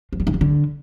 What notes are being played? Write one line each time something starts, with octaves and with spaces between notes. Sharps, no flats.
F3
G3
D#3
E3
D3